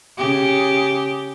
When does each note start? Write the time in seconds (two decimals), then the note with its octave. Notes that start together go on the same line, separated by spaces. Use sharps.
0.17 C#3 G4